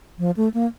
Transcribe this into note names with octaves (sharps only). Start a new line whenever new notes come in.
F3
A3
A#3